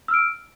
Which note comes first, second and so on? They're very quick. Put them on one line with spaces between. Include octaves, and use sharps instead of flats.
E6 F6 D7